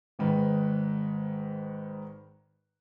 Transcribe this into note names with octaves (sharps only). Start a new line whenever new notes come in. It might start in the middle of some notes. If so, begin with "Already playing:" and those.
G#1 G#2 D#3 B4